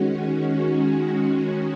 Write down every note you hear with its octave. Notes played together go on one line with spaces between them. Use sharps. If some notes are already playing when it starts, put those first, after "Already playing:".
Already playing: D#3 G#3 C#4 F#4